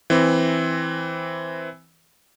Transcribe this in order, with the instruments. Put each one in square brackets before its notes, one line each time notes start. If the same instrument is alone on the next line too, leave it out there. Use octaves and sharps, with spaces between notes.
[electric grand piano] E3 C4